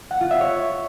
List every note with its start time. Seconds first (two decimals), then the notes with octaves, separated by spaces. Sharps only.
0.11 F#5
0.21 F4
0.31 E5
0.41 C#5